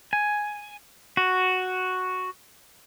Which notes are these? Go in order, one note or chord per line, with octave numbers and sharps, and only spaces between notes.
G#5
F#4